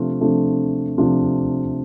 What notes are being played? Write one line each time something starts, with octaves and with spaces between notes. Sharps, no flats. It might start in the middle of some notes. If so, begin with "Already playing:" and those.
Already playing: C3 F3 A3 D4 F4
C3 F3 A3 D4 F4
C3 F3 A3 D4 F4